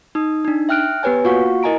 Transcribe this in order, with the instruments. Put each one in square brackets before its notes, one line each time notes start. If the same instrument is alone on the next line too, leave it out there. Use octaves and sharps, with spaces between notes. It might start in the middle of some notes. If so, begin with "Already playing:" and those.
[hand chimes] D#4 D#6
D4 D#4
E5 G5 F6 F#6 D7
B3 G4 B4 C#5 G#5
A#3 F4 F#4 F5 F#5 C#6
E4 A#4 D#5 G#5 A#5 D7